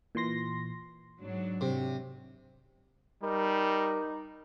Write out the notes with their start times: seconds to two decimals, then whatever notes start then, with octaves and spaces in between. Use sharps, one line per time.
0.15 A#2 E3 C6 A#6
1.19 G#2 F#3 D4
1.61 C3
3.23 G3 D#4 A#4